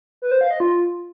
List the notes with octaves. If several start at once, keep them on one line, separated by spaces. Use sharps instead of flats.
B4
C5
F5
D#5
F4